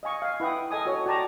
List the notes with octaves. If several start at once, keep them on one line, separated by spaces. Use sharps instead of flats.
D#5 F5 G#5 C#6
F5 G#5
E4 B4 F#5 G5 D#6
A4 D#5 G#5 D#6
F#4 C#5
F#4 D5 G5 A5 A#5 C#6